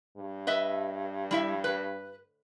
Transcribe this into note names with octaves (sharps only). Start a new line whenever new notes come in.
G2
B4 D#5 E5
G3 E4 E5
B4